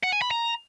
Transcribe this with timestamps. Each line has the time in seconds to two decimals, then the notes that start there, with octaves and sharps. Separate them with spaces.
0.03 F#5
0.12 G#5
0.22 B5
0.31 A#5